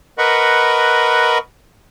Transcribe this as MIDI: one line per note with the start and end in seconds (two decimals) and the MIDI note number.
0.18 1.38 70
0.18 1.38 71
0.18 1.38 75
0.18 1.38 78
0.18 1.38 83
0.18 1.38 85